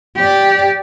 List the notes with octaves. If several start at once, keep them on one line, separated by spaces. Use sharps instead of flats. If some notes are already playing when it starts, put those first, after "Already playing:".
G4 D5